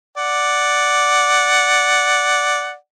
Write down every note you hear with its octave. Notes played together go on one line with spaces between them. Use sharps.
D5 F#5